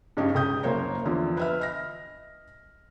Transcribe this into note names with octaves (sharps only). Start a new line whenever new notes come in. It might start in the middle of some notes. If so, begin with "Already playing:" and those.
G2 C#3 C#4 D#4 G4
C#2 D#6 G6
F#1 A#3 C5 C#5 A#5
E2 D3 F3
B4 E5 F6
D#5 F6 A#6